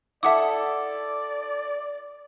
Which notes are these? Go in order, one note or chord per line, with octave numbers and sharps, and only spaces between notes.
E4 A4 D5 E5 F#5 D6 D#6